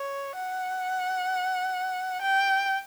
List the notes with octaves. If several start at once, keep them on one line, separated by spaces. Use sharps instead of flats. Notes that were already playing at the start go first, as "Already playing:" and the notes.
Already playing: C#5
F#5
G5